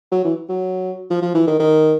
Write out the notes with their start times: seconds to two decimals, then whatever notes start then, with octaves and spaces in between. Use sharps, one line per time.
0.11 F#3
0.24 E3
0.49 F#3
1.10 F3
1.22 F3
1.34 E3
1.47 D#3
1.59 D#3